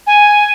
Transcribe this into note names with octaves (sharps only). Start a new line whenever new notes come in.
G#5